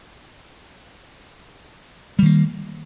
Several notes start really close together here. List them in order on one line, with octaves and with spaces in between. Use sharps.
G3 D#3 A#3